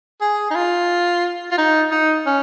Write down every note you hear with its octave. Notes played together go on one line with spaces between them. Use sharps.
G#4
D#4
F4
F4
D#4
D#4
C#4